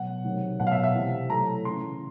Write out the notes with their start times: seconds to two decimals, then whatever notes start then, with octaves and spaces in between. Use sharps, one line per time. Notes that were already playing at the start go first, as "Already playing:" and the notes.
Already playing: B2 F#3 F#5
0.24 C3 D#3 F#3
0.60 B2 F#3 F#5
0.67 F5
0.71 E5
0.84 E5
0.95 C3 E3
1.29 A2 F#3 A#5
1.65 C#3 E3 C6